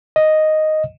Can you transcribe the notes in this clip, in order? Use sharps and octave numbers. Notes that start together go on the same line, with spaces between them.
D#5